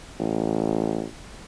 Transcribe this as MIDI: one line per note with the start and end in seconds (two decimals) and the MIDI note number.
0.19 1.04 33